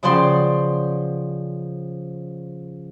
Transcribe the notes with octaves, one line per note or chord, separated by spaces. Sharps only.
C#3 F3 D5 F#5 G5 C6